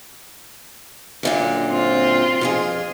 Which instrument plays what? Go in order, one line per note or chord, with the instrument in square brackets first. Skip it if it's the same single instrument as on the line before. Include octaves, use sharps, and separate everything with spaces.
[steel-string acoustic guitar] F#2 A#2 D3
[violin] C4 F4
[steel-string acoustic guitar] F2 F#4 G#4